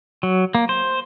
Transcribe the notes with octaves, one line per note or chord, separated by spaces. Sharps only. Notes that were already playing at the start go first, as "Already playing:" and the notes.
F#3
A#3
C5